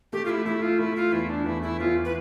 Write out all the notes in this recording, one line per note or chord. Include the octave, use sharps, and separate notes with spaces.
A3 G4
F4
E4
A3 E4
F4
A3 E4
F4
E2 E4
D4
E2 E4
E4
E2 F4
B4